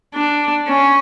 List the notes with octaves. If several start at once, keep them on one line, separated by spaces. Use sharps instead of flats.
D4
C#4